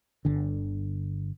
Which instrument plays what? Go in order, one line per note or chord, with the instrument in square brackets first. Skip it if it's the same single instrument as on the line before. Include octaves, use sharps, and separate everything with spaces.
[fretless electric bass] G1 D3